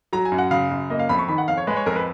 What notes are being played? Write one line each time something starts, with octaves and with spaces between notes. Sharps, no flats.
F#3 A#5
G#5
F#2
F#5
C#3 F5
F#2
A#3 D#5
F5
F2 B5
C#6
D#3 B5
F#5
F2 F5
C#5
G#3 B4
C#5
F2 A#4
B4